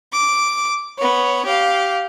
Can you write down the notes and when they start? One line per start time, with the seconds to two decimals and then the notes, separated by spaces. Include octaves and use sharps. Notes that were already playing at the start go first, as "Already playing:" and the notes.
0.13 D6
0.98 B3 C#5
1.45 G4 F5